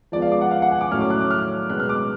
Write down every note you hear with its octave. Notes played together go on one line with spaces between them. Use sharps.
F3 G#3 B3 D5
F5
D6
F#5
F5
F#5
G#5
D6
A2 F#3 A3 C#4 F6
D6
F#6
D6
F6
B2 G#3 B3 F#6
F6
D6